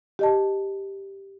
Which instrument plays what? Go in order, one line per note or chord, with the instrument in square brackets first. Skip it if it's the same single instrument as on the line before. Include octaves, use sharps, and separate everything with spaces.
[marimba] G4 D#5 A5